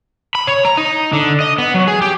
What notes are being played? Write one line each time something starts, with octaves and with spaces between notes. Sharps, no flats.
B5
C#5
A#5
D#4
D3
D#5
B3
F#3
G#4
G4